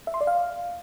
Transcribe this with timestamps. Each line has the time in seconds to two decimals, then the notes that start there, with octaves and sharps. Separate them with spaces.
0.07 E5
0.14 C6
0.21 D5
0.27 F5